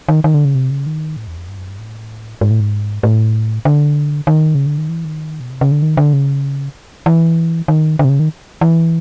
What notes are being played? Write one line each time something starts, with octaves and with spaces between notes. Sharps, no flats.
D#3
D#3
D3
C#3
C3
C#3
D#3
A2
E2
F2
G2
F#2
G2
A2
G#2
A2
G#2
A2
D3
D#3
C#3
D3
D#3
E3
D#3
B2
C3
C#3
D3
D#3
D3
C#3
E3
D#3
D3
C3
C#3
D#3
E3